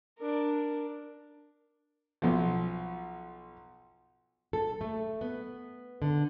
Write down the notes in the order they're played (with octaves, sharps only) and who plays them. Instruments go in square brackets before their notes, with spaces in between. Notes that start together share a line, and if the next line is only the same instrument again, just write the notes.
[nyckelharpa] D4 A#4
[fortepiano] B1 F3
[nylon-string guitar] A4
A3
B3
D3